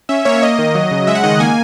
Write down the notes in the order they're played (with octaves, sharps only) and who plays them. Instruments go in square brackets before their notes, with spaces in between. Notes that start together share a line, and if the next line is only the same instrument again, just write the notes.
[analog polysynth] C#4 E5
A#3 C#5
A#3 D#5
D#3
F#3
C#3
G#3 E5
F#5
D#3 D#5
A#3 G#5